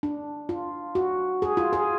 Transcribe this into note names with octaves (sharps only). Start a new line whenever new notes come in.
D4
F4
F#4
G#4
F4
G#4